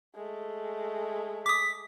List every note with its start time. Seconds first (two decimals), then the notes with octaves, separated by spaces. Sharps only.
0.15 G#3 A3
1.46 D6 D#6 B6